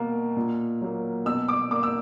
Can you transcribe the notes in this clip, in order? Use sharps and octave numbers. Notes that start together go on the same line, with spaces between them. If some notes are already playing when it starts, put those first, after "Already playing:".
Already playing: B2 A#3
A#2
F#3 A#3
B2 E6
D6
A#3 D6
E6